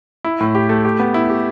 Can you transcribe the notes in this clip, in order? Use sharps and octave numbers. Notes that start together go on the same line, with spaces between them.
E4
A2
G4
A3
G4
B3
E4
G4